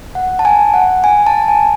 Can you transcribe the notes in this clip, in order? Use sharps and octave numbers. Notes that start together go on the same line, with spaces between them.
F#5
A5
G#5
F#5
G#5
A5
G#5